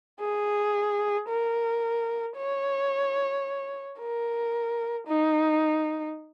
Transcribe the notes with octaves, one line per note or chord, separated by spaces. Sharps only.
G#4
A#4
C#5
A#4
D#4